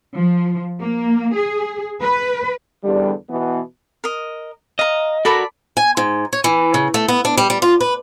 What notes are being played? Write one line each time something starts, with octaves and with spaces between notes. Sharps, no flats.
F3
A#3
G#4
B4
E2 D3 G3
B2 E3 B3
A#4 D#5
D#5 F5 A#5
F#4 A4 A#4 D5 B5
G#5
G#2
C#5
E3
C#3
A3
B3
D4
G3
G3
F4
B4